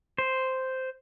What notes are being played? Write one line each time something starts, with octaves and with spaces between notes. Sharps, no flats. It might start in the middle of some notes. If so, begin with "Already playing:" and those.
C5